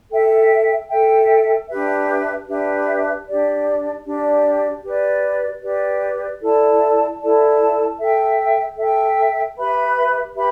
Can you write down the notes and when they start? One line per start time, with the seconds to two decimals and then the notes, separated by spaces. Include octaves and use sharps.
0.11 A4 E5 G5
0.90 A4 E5 G5
1.68 D4 G4 B4 E5
2.47 D4 G4 B4 E5
3.26 D4 G4 D5
4.04 D4 G4 D5
4.83 G4 B4 D5
5.62 G4 B4 D5
6.41 E4 A4 D5 A5
7.20 E4 A4 D5 A5
7.98 A4 E5 G5
8.77 A4 E5 G5
9.55 G4 B4 E5 B5
10.35 G4 B4 E5 B5